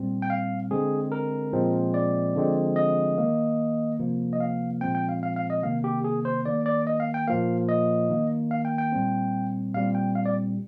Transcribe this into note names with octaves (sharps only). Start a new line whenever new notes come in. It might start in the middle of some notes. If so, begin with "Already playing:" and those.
Already playing: A#2 G3 C4
G5
F5
D3 G#3 C4 G#4
A#4
A#2 F3 G#3 C4
D5
D3 F3 G#3 C4
D#5
D#3 A#3
C3 F3 A#3
D#5
F5
A#2 F3 G#3 C4 G5
G5
F5
F5
F5
D#5
C3 D#3 A#3 F5
G4
G#4
C5
D#3 A#3 D5
D5
D#5
F5
G5
A#2 F3 A#3 F5
D#5
D#3 A#3
F5
G5
G5
A#2 G3 C4
A#2 G3 C4 F5
G5
F5
D5